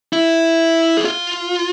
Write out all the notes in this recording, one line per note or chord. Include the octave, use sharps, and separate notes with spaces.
E4
G#4
F4